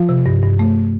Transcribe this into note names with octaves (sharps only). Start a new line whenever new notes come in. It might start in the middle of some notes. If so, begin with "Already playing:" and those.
Already playing: F3 F4
C3
G2
G2
A3